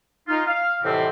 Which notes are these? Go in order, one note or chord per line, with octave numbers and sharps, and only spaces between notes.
D#4 F4
F5
F2 A2 C3 E3 G3 C4